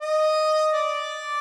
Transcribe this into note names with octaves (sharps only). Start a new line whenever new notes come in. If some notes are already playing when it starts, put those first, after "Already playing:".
D#5
D5